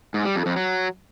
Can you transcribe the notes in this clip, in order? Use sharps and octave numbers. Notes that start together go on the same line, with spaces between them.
G#2
G3
F2
F2
F#3